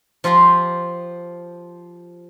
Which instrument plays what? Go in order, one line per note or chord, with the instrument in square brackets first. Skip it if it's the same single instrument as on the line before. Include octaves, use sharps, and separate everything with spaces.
[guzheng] F3 F4 G4 F5 A#5